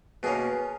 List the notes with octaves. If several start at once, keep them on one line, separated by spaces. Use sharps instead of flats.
B2 A#3 C#4 G#4